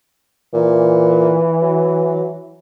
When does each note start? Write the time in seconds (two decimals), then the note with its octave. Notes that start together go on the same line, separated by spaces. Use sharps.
0.54 A#2 E3
1.62 F#3